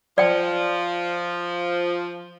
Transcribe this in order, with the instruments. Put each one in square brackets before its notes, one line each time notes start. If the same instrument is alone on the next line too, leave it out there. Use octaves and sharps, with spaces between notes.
[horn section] F3 [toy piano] D5 G5